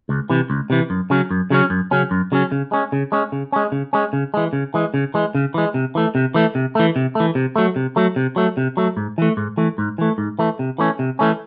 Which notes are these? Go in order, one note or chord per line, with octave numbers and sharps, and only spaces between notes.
C#2
C3 E3
C#2
C3 E3
F#2
C#3 F#3 C#4
F#2
C#3 F#3 C#4
F#2
C#3 F#3 C#4
F#2
C#3 F#3 C#4
C#3
G#3 C#4
C#3
G#3 C#4
C#3
G#3 C#4
C#3
G#3 C#4
C#3
E3 G#3
C#3
E3 G#3
C#3
E3 G#3
C#3
E3 G#3
C3
E3 A3
C3
E3 A3
C3
E3 A3
C3
E3 A3
C3
F#3 A3
C3
F#3 A3
C3
F#3 A3
C3
F#3 A3
G#2
E3 A3
G#2
E3 A3
G#2
E3 A3
G#2
E3 A3
C3
E3 A3 C#4
C3
E3 A3 C#4